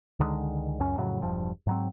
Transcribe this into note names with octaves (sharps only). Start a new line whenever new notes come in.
C#2 D3 D#3 G#3
C#2 F#2 C#4
F2 A2 C#3 F#3
E1 G2 F3
G#2 F#3 C4